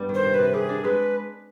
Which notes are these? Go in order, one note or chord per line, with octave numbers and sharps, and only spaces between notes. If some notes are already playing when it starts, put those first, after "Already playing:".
Already playing: G2 G3 B3 D#4
D#3
C5
C3
B4
C3
G4 G#4
D4
G#3 B4